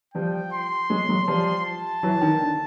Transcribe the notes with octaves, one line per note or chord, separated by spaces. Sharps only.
F3 G3 G5
C6
F#3 G#3
F#3 G#3
F3 G3
A5
E3 F#3
D#3
D3